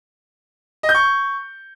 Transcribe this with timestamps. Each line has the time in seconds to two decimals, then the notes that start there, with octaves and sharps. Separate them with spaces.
0.83 D#5
0.89 G6
0.95 C#6